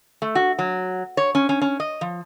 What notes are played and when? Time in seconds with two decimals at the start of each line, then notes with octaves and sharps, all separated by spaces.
0.22 A3
0.35 F#4
0.59 F#3
1.17 C#5
1.35 C#4
1.49 C#4
1.61 C#4
1.80 D#5
2.01 F3